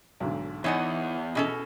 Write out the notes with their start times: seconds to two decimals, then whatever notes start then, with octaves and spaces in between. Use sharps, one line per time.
0.20 B1 G#2 D3
0.64 E2 E3 D#4 C#5 F#5 G#5
1.35 B2 C#4 G#4 A4 D#5